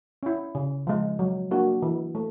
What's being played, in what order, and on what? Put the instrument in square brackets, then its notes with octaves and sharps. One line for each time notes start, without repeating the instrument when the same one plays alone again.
[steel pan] C#4 E4
C#3
F3 G#3
F#3
A#3 D4 F#4
E3
A3